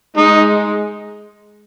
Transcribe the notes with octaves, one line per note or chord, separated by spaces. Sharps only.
G#3 D#4